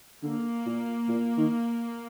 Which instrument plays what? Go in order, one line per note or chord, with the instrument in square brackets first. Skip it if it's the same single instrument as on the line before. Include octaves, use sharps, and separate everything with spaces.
[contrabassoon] D3 [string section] A#3
[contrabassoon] A#2
A#2
D#3